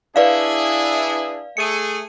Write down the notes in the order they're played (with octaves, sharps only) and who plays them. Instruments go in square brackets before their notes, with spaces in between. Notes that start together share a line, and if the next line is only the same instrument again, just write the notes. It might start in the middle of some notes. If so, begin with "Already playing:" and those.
[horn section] D4 E4 G#4 [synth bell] B4 D5 F5
[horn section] A3 G#4 [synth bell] C#7 D#7